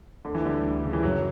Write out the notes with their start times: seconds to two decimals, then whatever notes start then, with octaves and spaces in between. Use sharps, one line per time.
0.25 D2 D3
0.35 E3
0.44 D3 G3
0.64 D2
0.84 C#3
0.93 E3
1.03 F#2 F#3